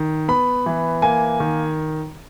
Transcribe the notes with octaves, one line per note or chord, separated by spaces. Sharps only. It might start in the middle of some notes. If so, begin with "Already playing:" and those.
Already playing: D#3
B3 B5
E3
A#3 G#5
D#3